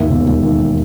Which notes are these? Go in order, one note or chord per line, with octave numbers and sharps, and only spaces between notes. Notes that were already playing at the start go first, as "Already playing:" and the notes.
Already playing: D#2 D#3 E5
E1
E1
D#3